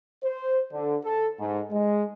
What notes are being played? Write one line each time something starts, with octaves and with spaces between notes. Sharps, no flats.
C5
D3
A4
G#2
G#3